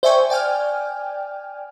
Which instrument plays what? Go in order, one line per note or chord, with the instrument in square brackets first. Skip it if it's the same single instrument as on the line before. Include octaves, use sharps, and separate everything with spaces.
[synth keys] C5 D5 E5 G5 G#5 C#6
D5 G5 G#5 F6